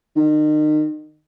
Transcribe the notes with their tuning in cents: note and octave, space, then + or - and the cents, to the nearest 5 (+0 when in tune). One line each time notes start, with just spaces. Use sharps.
D#3 -35